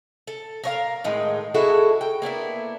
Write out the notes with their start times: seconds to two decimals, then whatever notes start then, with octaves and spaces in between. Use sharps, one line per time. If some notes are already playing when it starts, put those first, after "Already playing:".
0.27 A4
0.64 A#4 C#5 F5
1.04 A2 D#3 G#3
1.54 G#3 E4 F#4 A4
2.01 G5
2.22 A#3 B3 D4 E4